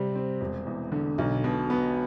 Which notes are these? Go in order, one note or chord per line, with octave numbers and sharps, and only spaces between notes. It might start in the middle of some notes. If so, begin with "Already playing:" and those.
Already playing: C3 G3 C4
C4
E1
E2
D3
B1
B2
B3